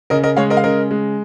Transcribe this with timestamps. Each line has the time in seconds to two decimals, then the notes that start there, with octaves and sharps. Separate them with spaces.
0.10 C#3 A#4 D#5
0.23 A#4 D#5
0.37 G#3 C#5 F5
0.50 A#4 D#5
0.57 F5
0.64 C#3 A#4 D#5
0.91 G#3